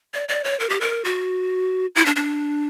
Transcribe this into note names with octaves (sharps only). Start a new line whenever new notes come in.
D5
D5
C#5
A#4
G4
A#4
F#4
E4
D4
D4